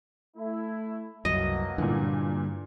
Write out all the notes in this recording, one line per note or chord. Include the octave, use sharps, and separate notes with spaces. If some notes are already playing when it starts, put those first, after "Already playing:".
A3 E4
C2 F#2 B2 F#3 A#3 D#5
G2 A#2 D3 E3